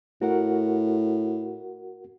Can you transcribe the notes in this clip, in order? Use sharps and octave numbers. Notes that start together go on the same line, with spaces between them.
A2 F#4 A#4 F#5